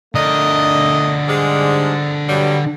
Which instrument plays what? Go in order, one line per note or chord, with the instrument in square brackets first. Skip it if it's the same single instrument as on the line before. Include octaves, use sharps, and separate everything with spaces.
[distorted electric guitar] D3 A#4 [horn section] A3 D4 D#5
[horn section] G#2 G3 G#3
G2 F#3 G3